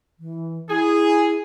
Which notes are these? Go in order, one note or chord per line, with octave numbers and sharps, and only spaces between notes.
E3
E4 G#4